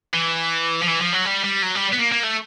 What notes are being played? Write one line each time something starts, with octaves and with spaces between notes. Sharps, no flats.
E3
F3
E3
F3
F#3
G3
G3
F#3
G3
B3
A#3
A#3
A3